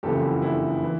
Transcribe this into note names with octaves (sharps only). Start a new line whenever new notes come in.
F#1 F2 C#3 E3 G4 A4
E4 F#4
D4 E4
E3